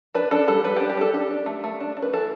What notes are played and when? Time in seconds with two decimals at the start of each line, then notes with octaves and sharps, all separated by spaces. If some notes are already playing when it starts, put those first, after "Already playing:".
0.14 D4 B4
0.31 D4 A4
0.48 G3 A4
0.64 G3 B4
0.76 D4 G4
0.89 G4
0.97 D4 A4
1.13 D4 G4
1.31 D4
1.46 A3
1.64 A3
1.80 D4
1.97 D4
2.02 B4
2.13 E3 A4